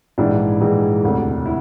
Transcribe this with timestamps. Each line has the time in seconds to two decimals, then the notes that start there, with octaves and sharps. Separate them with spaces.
0.18 A#1 G#2 E3 G#3 D4 E4
0.60 A#1 G#2 E3 G#3
1.04 E1 D2 C3
1.46 E4